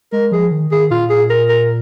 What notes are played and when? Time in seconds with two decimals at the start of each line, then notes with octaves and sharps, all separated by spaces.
0.12 G#3 A#4
0.32 F3 G#4
0.51 D#3
0.71 D#3 G#4
0.91 A#2 F4
1.10 G#4
1.30 A#4
1.49 A#4